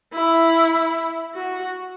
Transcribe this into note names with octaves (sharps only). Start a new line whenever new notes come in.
E4
F#4